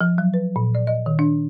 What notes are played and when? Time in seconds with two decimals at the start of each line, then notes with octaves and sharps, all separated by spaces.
0.01 F3
0.18 F#3
0.34 B4
0.56 A#2
0.75 D5
0.87 D#5
1.06 D#3
1.19 D4